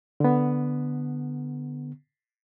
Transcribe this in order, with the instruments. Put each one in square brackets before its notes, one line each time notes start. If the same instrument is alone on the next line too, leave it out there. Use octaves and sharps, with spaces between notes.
[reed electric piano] D3 B3